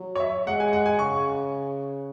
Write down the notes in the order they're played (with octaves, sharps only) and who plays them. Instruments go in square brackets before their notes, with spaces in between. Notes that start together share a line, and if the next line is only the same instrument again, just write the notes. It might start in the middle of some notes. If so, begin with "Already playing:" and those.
Already playing: [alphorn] F#3
[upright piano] C#5
E5
[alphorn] G#3 [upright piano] F#5
[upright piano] G#5
F#5
G#5
[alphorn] C#3 [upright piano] C#6